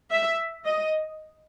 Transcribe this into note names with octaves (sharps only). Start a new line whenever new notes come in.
E5
D#5